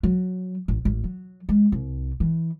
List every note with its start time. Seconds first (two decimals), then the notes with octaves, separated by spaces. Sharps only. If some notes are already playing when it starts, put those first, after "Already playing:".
0.03 F#3
0.68 A1
0.85 A1
1.04 F#3
1.49 G#3
1.72 C2
2.20 E3